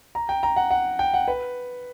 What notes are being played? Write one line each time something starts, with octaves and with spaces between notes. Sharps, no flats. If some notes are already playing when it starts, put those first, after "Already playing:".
A#5
G5
A#5
F#5
F#5
G5
F#5
B4